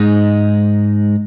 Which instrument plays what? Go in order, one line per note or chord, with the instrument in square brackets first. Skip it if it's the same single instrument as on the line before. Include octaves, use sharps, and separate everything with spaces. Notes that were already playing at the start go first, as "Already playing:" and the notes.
Already playing: [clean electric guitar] G#2 G#3 D#4